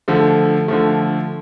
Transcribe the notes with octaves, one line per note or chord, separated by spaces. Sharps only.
D3 F3 A3
D3 F3 A3